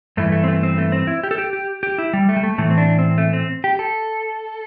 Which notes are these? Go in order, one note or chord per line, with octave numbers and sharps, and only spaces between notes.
G2 E3 A3
A3
C4
A3
C4
A3
C4
E4
G4
A4
G4
G4
G4
E4
G3
A3
G3
A3
A2 E3 A3
C4
D4
C4
A3
C4
G4
A4